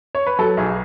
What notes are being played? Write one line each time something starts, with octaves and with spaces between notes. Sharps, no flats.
C#5
B4
F#3 A4
B1 G#4